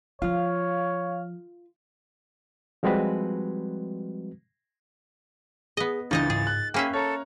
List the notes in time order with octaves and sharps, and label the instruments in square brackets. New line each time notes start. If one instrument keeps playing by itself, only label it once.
[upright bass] F3 [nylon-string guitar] F4 [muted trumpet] C#5 [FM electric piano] F5 F6
[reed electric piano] F3 G3 G#3 C4 F#4 B4
[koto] B3 D#5 [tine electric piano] G#4
[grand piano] C#2 E3 [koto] A#3 D#4 D#5 [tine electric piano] D4 [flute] A6
[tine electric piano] G#2 [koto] G#4
[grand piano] F#6
[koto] A#3 C#4 E5 [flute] G#4 [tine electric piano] G5 B5 C7
[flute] A4 [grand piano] C#5 A#5 [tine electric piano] F6